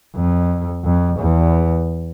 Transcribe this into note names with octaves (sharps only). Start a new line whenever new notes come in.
F2
F2
E2